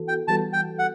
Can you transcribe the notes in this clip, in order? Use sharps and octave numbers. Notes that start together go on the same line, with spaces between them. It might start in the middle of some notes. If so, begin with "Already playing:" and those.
Already playing: E3 B3 F#4 A4
G5
E3 G3 B3 F#4 A4 A5
G5
F#5